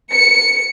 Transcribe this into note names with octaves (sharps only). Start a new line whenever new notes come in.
C#7